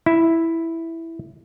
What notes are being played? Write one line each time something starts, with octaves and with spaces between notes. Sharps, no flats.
E4